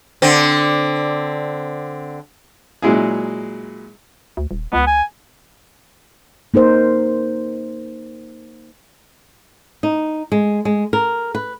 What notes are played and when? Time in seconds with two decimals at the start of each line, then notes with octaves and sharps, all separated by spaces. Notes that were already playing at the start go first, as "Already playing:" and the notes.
0.22 D3 C4
2.82 A#2 F#3 G#3 E4 G#4
4.37 D2
4.51 D#1
4.73 C#2 B3
4.87 G#5
6.54 A#3 D#4 A#4 C5
9.83 D#4
10.32 G#3
10.65 G#3
10.93 A#4
11.35 B4